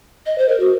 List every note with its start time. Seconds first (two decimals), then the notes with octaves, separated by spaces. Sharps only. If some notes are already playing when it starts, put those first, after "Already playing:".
0.26 D#5
0.38 C5
0.49 A#4
0.60 F#4